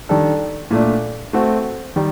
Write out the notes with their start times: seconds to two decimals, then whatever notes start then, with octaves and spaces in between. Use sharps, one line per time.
0.09 D#3 G3 D4 A4
0.71 A#2 A3 D4
1.33 A3 C4 F#4
1.96 D#3 G3